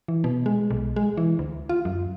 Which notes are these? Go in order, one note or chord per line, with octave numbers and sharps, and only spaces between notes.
E3
B2
G#3
B1
G#3
E3
D2
F4
F#2